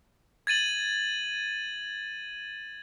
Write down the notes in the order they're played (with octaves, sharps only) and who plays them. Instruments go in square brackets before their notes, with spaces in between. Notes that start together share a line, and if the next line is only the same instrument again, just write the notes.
[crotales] G#6 A6 D#7 F#7